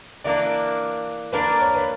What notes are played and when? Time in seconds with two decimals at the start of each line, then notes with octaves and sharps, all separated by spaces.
0.24 E3 A#3 D4 D5
1.33 A#3 D4 A#4 B4
1.61 C#5
1.75 B4